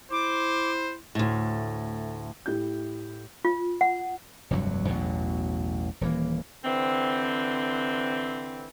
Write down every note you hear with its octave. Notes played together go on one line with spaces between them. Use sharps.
E4 C5 D6
D2 A2
A2 E4 G4 G6
F4
F#5
F1 D2 G2 F#3
A1 E2 B2 F#3
D#1 E3 A#3
D3 E3 C4